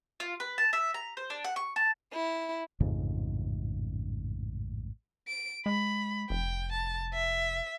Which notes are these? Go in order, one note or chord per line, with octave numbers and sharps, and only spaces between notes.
F4
B4
A5
E5
A#5
C5
D4
F#5
C#6
A5
E4
A1 F2 G#2 C#3
D7
G#3 B5
F1 G5
A5
E5